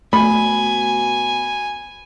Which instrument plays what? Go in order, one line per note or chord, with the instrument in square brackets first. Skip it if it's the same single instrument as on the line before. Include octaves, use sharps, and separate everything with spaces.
[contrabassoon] B2 [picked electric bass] A3 [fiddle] G#5 [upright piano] B5